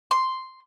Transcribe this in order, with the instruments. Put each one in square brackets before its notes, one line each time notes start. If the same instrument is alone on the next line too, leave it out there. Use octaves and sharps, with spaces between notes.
[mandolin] C6